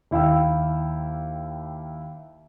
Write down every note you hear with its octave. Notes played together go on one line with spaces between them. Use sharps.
D#2 E4 F5 G5 E6